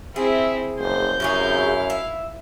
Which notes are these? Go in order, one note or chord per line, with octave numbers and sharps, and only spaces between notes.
C4 E4 G#4 E5
F#1 C5 G6
F#2 C3 E4 F#4 G#4 F5
E5